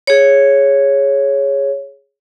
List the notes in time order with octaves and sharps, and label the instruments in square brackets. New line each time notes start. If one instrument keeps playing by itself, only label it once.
[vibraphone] G#4 C#5